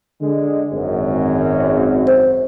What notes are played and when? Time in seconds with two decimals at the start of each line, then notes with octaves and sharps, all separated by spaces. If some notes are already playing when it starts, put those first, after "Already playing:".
0.22 D3 G#3
0.72 G#1 F#2
2.07 C5